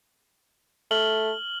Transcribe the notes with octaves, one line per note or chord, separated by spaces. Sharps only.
A3 F6 F#7 G7